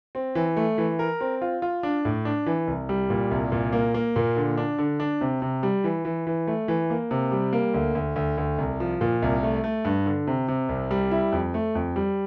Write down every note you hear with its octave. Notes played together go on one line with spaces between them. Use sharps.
C4
E3
A3
E3
A#4
C4
F4
F4
D4
A2
D4
E3
C2
G3
A#2
C2
A#2
A#3
A#3
A#2
D3
D4
D3
D4
C3
C3
G3
E3
E3
E3
A3
E3
A#3
C3
G3
A#3
D2
D2
D2
D2
C2
F3
A#2
C2
A3
A3
G2
D3
C3
C3
C2
G3
E4
F2
A3
F2
G3